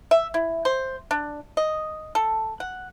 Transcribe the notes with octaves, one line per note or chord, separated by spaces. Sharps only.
E5
E4
C5
D4
D#5
A4
F#5